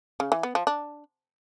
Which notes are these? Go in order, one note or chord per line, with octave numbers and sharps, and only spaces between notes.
C#3
E3
B3
F3
D4